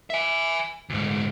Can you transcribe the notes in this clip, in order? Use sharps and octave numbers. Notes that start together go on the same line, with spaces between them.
E5 G#5
D2 G#2